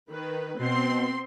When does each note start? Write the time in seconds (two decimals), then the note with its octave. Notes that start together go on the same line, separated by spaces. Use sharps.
0.11 D#3 B4
0.59 B2 C4 C6